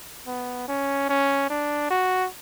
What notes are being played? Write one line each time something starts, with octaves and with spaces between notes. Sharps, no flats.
B3
C#4
C#4
D4
F#4